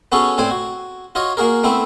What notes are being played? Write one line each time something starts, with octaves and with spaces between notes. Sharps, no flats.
B3 C#4 F#4 G#4 A4 C#5
A2 C4 C5 D5 G#5
F#4
F4 F#4 C#5 D#5
A#3 F#4 G#4 A#4
A3 B3 C4 E4